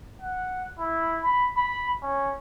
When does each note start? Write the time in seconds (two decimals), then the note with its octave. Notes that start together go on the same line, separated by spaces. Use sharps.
0.22 F#5
0.79 E4
1.23 B5
1.57 B5
2.03 C#4